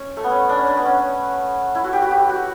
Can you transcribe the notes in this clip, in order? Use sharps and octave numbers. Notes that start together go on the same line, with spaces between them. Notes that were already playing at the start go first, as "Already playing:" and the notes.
Already playing: C#4
A3
B3
C#4
D4
C#4
D4
B3
C#4
E4
F#4
G4
F#4
G4
F#4